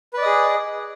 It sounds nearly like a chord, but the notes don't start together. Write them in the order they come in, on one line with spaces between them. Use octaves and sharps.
B4 D5 D#5 G#4